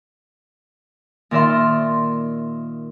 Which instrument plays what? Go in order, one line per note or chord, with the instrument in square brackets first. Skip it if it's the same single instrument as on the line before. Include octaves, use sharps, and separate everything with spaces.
[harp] A#2 D#3 D5 E5 F5 C6